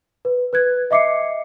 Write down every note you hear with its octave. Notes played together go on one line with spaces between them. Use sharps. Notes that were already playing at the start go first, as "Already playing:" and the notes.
B4
B4 F#6 G#6
D#5 E5 D6 C7 C#7